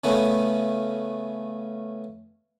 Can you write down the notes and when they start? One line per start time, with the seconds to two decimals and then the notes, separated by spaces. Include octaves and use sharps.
0.04 C#3 A3 B3 C#4